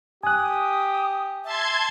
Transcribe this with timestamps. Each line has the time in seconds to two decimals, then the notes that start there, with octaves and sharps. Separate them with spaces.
0.23 G4 G#5 D#6 F#6
1.44 E5 A5 C6 G#6